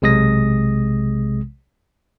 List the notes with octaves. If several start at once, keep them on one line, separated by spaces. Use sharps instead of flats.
B1 C3 G#3 D#6 A#6